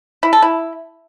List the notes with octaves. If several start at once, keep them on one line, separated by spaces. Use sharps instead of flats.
E4
A4
E4